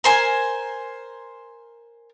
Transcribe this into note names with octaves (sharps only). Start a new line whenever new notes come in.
A#4 C5 G#5